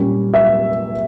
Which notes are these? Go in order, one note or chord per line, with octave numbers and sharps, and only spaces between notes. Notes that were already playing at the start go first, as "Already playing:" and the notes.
Already playing: A#2 G3 A#3 C#4
E5